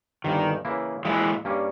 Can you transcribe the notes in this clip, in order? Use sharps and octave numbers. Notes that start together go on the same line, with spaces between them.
G1 G2 D#3 E3 A#3
C#3 E3 A#3 E4
A#2 E3 G#3 A#3 E4
G2 G3 A#3 C#4